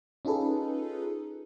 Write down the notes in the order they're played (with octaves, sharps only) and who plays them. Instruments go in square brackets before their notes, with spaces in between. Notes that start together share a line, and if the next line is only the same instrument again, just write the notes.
[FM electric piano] C#4 D#4 F4 G#4 A4 B4